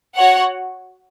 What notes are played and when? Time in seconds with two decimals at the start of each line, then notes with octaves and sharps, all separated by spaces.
0.16 F#4 C#5 F#5